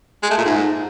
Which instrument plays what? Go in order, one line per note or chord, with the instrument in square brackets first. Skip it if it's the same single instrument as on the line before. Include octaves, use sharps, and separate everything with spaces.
[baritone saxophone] G#3
A3
A#2
G#2